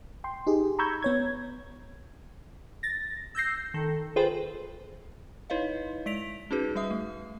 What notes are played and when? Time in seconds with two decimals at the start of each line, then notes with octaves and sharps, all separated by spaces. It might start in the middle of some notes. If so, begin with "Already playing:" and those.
0.24 G5 C6
0.47 D#4 G4 G#4
0.79 A#5 B5 C#6 E6 G6 G#6
1.03 B3 C#5 G#6
2.83 A6 A#6
3.35 E6 G6 A#6 C7
3.74 D#3 A4
4.16 F4 G#4 B4 C5 G5
5.50 D#4 E4 B4 C#5 D#5 F5
6.06 G#3 D5 B6 D7 F7
6.51 C#4 D#4 F#4 G#4 B4
6.75 G3 B4 E5 D#6
6.91 A3